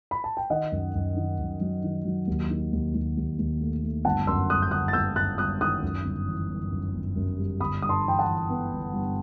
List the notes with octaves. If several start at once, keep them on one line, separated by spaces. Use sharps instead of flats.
B5
A5
G5
D#3 D#5 F#5
F#2
F#2
D#3
F#2
F#3
D#3
F#3
D#2
D#3
D#2
D#2
D#2
D#2
A3
A3
G1 F#5 A5
F#2 C6 E6
G1 D#6 F#6
G6
G1 D#6 F#6
A6
G1 E6 G6
G1 F#6 A6
G1 D#6 F#6
D#3 D#6 F#6
F#2
G1
E3
G1
F#2
G1
F#2
G3
G1 B5 D#6
G2 D#6
A5 C6
E3 G5
F#5 A5
E3
B3
G1
G2